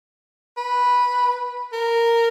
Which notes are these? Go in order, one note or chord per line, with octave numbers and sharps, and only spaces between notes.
B4
A#4